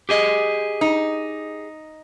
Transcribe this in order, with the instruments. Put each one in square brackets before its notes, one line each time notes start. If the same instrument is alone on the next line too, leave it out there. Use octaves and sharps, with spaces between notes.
[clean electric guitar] G4 G#4 D#5
[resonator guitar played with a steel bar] D#4